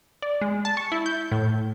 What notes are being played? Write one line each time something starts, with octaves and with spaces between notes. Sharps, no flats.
D5
G#3
A5
C#6
E4
G6
A2